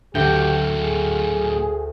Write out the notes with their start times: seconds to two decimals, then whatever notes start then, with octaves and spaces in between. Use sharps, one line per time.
0.15 D2 A2 F#3 G4 G5
0.79 G#4